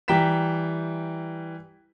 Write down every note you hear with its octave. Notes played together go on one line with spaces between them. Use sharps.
E3 G3 G5 A#5 B6 E7